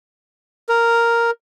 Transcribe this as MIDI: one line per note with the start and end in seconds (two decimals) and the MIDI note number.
0.69 1.31 70